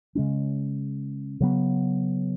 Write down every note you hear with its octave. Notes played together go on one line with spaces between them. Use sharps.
C#3 G#3 C#4
C#3 F#3 B3